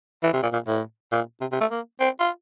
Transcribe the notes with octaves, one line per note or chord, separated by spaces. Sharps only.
E3
C3
A#2
A#2
A2
A#2
C3
C3
A3
A#3
C4
F4